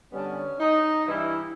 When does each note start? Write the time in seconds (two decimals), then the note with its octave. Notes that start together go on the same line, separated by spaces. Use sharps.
0.11 D3 G3 B3 C#4
0.59 D#4
1.06 G2 E3 G3 E4